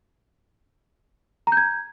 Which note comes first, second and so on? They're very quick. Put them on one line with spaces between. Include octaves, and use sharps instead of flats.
A#5 G6 G#6